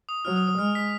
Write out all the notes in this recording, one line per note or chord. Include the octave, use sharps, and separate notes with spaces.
D#6
F#3 F6
D#6
D#6
G#3 F6
B6